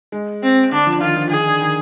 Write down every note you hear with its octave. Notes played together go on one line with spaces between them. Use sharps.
G#3
C4
D3 D4
F3
D#3 F4
F3
D#3 G#4
D3
D#3